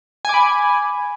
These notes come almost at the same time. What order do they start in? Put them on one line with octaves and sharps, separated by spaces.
G#5 D6 B5